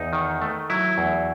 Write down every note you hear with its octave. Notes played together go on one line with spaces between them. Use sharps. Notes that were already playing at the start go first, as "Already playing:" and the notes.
Already playing: E2 D#4
D#3
A3
F#3 E4
E2